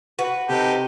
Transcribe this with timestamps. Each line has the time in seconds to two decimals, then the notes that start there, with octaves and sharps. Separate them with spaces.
0.19 F#4 B4
0.49 C3 D#4 G4 A4